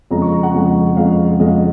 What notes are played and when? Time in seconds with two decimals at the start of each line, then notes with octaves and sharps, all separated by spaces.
0.11 F2 C#3 G#3 A#5
0.22 C#6
0.32 A#5
0.43 F#5
0.54 F2 C#3 G#3 F#5
0.96 F2 C#3 G#3 F5
1.40 F2 C#3 G#3 D#5